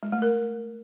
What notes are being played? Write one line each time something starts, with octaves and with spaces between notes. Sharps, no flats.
G#3
A3
A#4